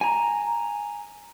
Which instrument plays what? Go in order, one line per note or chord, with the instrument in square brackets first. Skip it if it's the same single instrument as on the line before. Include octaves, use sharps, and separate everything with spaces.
[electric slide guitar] G#5 A#5